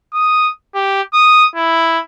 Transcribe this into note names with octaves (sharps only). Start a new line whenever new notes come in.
D#6
G4
D#6
E4